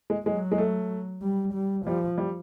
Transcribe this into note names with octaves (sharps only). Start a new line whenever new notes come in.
G#3
F#3 G#3
G#3
A3
G3
G3
F3 G3
G3